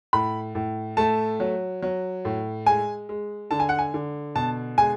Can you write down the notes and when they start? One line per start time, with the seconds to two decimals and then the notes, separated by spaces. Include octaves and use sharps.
0.13 A2 B5
0.55 A2
0.97 A3 A5
1.40 F#3
1.82 F#3
2.25 A2
2.66 G#3 G#5
3.09 G#3
3.51 D3 A5
3.60 G#5
3.69 F#5
3.79 G#5
3.94 D3
4.35 B2 A5
4.78 G#3 G#5